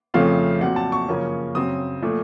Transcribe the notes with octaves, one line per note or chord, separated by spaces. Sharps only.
F2 C#3 F3 A3 C4 F5
A#2 F#3 C4 F#5
A5
C#6
F#2 C#3 F3 A#3 C#4
F#2 C#3 F#3 C4 D#6
A#2 F3 A3